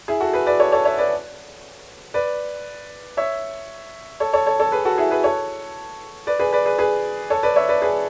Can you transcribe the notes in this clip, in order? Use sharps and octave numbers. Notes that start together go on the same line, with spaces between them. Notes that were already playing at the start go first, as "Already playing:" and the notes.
E4 G#4
F#4 A4
G#4 B4
B4 D5
A4 C#5
A4 C#5
C#5 E5
B4 D5
B4 D5
C#5 E5
A4 C#5
A4 C#5
A4 C#5
A4 C#5
G#4 B4
F#4 A4
E4 G#4
G#4 B4
A4 C#5
B4 D5
G#4 B4
B4 D5
G#4 B4
G#4 B4
A4 C#5
B4 D5
C#5 E5
B4 D5
G#4 B4